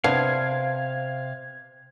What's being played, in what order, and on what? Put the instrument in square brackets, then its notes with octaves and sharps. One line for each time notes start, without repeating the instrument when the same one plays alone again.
[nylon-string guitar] C3 [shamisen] B3 D4 [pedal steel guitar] F5 [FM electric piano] G#6